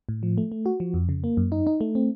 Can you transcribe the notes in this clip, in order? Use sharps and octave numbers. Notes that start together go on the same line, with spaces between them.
A2
F3
A3
A3
F#4
F3
F2
C#3
A#3
F#2
D#4
D#4
A3
C4